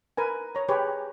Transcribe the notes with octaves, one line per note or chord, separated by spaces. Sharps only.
A#4 B4 G#5
C#5 A#5
G4 G#4 B4 C#5